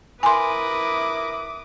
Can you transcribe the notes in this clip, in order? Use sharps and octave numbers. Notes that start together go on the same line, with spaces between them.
E4 A#4 B4 G#5 C6 D6 D#6